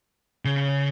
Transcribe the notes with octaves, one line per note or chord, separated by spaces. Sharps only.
C#3